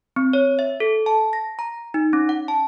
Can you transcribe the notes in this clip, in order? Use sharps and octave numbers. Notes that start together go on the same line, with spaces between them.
C4
C#5
E5
A4
A5
A#6
A#5
D#4
C#4
F#5
A5